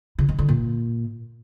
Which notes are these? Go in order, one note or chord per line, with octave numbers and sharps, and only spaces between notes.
C#3
D#3
D3
A#2